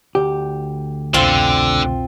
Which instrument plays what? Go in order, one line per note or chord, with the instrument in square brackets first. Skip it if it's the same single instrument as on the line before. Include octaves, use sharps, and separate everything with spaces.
[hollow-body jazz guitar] D2 G4
[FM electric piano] C2 F2 B2 [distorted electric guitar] D3 [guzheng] C4 F4